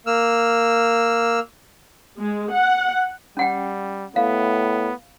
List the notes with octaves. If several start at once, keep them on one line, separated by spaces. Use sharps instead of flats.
A#3 E6 F6
G#3
F#5
G3 C#4 F#5 G5
A2 B3 F5